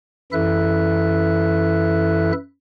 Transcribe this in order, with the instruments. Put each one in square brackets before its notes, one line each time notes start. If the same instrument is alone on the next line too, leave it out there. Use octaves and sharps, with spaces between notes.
[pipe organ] F#2 E3 E4 A4 E5 F#6